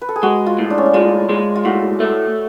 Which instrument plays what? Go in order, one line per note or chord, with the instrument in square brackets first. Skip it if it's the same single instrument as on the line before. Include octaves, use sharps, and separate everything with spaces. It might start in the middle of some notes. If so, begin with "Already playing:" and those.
[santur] B4
A4
G#4
[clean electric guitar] G#3 [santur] F#4
[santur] F4
[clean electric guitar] A2
[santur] D4
C#4
D4
[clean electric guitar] G#3 [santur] F4
[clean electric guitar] G#3
[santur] F4
[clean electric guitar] A2 [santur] F#4
[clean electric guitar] A3